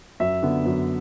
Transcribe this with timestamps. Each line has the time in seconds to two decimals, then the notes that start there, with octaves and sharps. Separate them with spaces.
0.20 F#2 E5
0.43 D3 B3
0.65 F#2